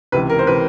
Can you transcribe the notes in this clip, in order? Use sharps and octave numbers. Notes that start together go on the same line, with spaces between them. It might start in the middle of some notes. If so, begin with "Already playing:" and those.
C#2 C3 E3 B4
A#4
C5
C3 E3 B4